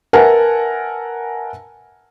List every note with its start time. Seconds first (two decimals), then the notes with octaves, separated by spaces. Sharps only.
0.13 A#4 B4 E5 F#5 G#5 A5